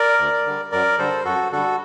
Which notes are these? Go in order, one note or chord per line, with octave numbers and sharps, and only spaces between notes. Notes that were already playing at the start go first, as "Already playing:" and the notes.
Already playing: A#4 D5
D2
D3 G3
F#2 A#4 D5
D3 G3 A4 C5
F#2 F#4 A4
D3 G3 F#4 A4